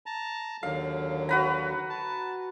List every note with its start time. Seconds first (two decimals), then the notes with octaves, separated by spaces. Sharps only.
0.06 A5 A#5
0.63 D#2 D3 F#3 F5
1.29 F#4 B4 A#5
1.90 A5